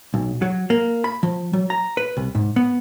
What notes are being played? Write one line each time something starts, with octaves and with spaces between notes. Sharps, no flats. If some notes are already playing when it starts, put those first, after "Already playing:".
B1
F#3
A#3
B5
F3
F#3
A#5
B4
C2
G#2
B3